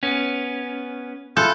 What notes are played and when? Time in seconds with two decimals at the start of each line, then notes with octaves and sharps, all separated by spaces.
0.03 B3 C#4
1.37 E4 F4 A4 F#6 G6